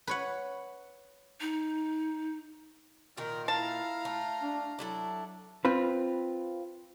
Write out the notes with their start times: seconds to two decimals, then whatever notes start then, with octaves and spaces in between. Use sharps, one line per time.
0.07 B4 C#5 F#5
1.41 D#4
3.17 A#2 D#3 A#4
3.48 E4 F5 A5 A#5
4.05 A3
4.42 D4
4.79 F#3 D4 E4 A4
5.65 C4 F4 B4